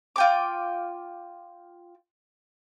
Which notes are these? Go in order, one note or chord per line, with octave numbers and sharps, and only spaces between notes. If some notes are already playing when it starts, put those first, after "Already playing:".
F4 G5 D6